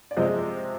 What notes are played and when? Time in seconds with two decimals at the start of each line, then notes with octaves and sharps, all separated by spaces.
0.11 D5
0.17 C3 F3 G#3 C5 D#5